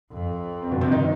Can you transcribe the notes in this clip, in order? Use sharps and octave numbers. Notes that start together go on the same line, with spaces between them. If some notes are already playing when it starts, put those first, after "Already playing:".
F2
C4
G2 B2 B3
C3 C4
D#3 D#4